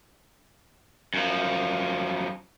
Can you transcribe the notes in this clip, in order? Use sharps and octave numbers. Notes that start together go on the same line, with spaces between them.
F#2 F3